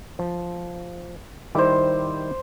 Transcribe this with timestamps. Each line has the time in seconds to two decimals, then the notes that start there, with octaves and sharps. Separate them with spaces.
0.19 F3
1.55 D#3 G3 E4 C5 D6